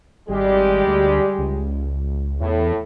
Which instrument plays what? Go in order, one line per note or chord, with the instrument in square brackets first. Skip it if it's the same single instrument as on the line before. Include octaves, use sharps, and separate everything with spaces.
[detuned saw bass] G#1 [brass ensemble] G3 G#3 G4
[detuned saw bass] D2
C#2
[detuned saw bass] E2 [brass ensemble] A2